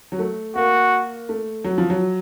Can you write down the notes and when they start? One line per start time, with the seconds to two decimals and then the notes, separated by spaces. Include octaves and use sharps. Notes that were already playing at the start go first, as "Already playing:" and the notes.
0.12 F#3
0.19 A3
0.55 A#3 F#4
1.29 A3
1.64 F#3
1.78 F3
1.90 F#3